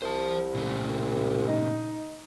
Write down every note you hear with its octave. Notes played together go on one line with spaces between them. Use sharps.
C2 C5 A5
A#2 C#3 A3
D#4